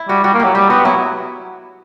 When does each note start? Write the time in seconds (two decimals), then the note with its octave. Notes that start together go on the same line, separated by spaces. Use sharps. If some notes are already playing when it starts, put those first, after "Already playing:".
Already playing: E4
0.09 G3 F#4
0.24 G3 F#4
0.34 A#3
0.39 F#3 G4
0.54 G3 G4
0.70 B3 F#4
0.85 F#3 E4